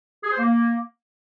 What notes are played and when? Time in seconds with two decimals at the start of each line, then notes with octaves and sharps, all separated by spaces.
0.24 G#4
0.31 C5
0.38 A#3